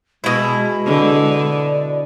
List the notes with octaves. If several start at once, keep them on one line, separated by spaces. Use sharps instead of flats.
B2 G#3 E4
D3
D5